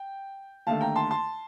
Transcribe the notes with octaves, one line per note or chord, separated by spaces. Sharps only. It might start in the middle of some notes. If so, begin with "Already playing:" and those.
Already playing: G5
D#2 D3 A3 F5 A5
G5 A#5
A5 C6
A5 C6